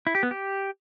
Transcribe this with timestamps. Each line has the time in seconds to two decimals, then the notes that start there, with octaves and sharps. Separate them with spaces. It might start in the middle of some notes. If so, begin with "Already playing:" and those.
0.07 E4
0.15 G4
0.23 B3
0.31 G4